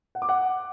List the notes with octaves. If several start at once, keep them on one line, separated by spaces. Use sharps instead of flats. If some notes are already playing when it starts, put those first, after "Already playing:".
F#5
D6
F#5